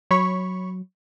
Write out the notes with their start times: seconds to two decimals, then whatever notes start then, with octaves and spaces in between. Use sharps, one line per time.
0.11 F#3 C#5 B5 C#6